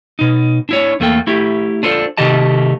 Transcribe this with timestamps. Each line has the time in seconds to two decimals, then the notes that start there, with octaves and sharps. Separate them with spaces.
0.19 B2 D#4
0.69 D4 E4 C#5
1.00 E2 A3 A#3 A4 G5
1.27 A3 E4 G4
1.83 D4 F4 A4 C5
2.17 C3 D#3 A3 G4 D#5 A5